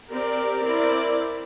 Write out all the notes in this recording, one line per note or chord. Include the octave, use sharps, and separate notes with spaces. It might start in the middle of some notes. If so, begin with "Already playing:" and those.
C4 G4 A#4 D5
C4 E4 A#4 D5